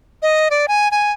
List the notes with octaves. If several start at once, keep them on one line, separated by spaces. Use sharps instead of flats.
D#5
D5
G#5
G#5